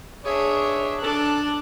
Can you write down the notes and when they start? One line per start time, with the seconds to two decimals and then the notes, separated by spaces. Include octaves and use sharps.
0.25 D4 G#4 C#5 E5
1.03 D4 A4 A5 F#6